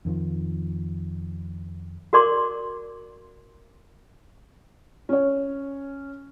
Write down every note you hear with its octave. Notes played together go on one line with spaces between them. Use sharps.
F2 D#3 F3
F#4 A#4 D5 C6 D6
C#4 C#5